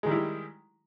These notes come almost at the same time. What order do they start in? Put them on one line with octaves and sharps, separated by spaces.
G#3 D#3 G3 E4 G4